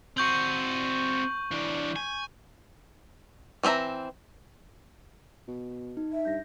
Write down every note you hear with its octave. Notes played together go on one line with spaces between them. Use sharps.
C4 F#4 C#6 G6 F#7
E3 D4
G#5
E3 C4 E4 E5 A#5
B2
D#4
E5
G2 G6 A#6